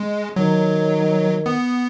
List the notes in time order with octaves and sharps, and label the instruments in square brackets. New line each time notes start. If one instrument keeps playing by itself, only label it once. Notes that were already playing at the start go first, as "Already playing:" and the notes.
Already playing: [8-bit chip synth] G#3
[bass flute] D#3 [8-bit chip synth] F#3
[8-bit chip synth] B3